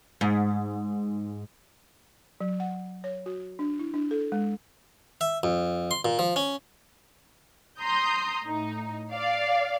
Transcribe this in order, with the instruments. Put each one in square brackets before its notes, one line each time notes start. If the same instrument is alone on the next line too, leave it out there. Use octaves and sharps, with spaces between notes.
[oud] G#2
[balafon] F#3
F#5
C#5
F#4
D4
E4
D4
A4
G#3
[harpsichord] E5
F2
C6
A#2
F3
C#4
[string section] A#5 C6 D#6 G6
A2 D#4
D5 F5